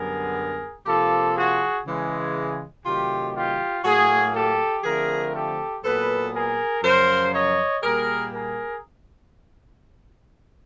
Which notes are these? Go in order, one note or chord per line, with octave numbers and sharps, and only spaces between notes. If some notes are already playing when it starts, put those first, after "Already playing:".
Already playing: F#2 D3 G3 B3 G#4 A#4
C3 F3 A#3 G4 A4
F#4 G#4
C#3 E3 G#3
C3 D#3 F#3 A3 F4 G4
F4 G4
A2 F#3 A#3 F#4 G#4
G4 A4
D3 F3 A3 C4 G#4 A#4
G4 A4
A#2 F#3 B3 A4 B4
G#4 A#4
F#2 C#3 F3 A#4 C5
C#5 D#5
A#2 G3 A#3 G#4 A#4
G#4 A#4